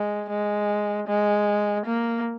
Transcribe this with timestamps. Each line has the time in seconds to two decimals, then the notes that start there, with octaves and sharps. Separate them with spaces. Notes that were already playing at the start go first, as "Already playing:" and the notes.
Already playing: G#3
0.30 G#3
1.08 G#3
1.86 A#3